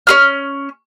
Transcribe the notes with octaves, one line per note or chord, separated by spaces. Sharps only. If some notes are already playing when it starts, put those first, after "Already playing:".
C#4 G#4 F6